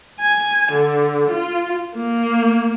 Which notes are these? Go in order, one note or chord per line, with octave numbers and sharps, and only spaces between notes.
G#5
D3
F4
A#3